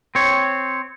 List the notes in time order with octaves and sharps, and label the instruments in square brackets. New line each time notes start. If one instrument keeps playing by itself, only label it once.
[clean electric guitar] C4 C#5